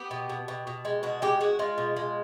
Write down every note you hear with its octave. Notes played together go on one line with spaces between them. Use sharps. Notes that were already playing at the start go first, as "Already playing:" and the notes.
Already playing: B3 G4
B2
B2
B2
B2
G#3
B2 F#4
G#3 G4
G#3 F#4
G#3 F4
B2
G#3